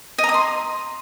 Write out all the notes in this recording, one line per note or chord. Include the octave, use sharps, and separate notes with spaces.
D#5
A#5
D#6
C6